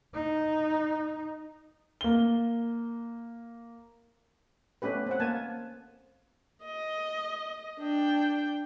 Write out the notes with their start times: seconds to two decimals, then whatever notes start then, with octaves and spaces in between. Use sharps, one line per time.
0.14 D#4
2.01 A#3 G7
4.82 A3 B3 C#4 G4 B4
5.07 C4 F#5
5.20 A#3 G#5 A5
6.64 D#5
7.81 D4 G5